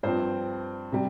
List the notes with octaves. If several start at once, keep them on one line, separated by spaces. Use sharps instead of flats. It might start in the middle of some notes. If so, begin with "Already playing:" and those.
G2 F3 C4 C5
C3 G3